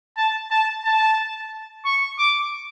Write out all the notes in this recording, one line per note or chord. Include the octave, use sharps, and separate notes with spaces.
A5
A5
A5
C#6
D6